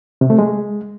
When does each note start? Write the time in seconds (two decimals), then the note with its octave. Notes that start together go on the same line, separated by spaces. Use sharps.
0.21 C3
0.30 A3
0.39 G#3